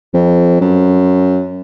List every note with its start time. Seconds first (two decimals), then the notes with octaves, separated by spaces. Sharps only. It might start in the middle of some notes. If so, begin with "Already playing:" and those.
0.14 F2
0.61 F#2